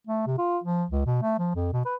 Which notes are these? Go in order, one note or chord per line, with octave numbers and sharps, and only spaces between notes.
A3
C3
F4
F3
C#2
B2
A3
F3
F2
B2
B4